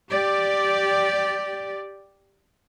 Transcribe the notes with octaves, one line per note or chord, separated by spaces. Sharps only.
G4 D5